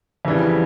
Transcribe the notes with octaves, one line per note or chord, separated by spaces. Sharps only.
F2 C#3 E3 G3